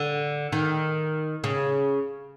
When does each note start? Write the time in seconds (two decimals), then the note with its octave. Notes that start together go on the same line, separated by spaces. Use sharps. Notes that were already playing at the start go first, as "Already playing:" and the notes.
Already playing: D3
0.52 D#3
1.44 C#3